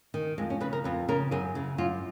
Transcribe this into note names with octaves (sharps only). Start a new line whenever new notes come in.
D#3
F2 G#3
C#4
C#3 B4
A#4
F2 B4
C#3 A#4
F#2 G#4
C#3
F#2 F4